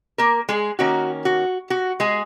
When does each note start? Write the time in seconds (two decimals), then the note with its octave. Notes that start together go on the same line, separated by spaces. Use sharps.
0.18 A#3 A#4
0.49 G#3 G#4
0.79 D#3 A#3 C#4 F#4
1.25 F#4
1.70 F#4
2.00 G#3 G#4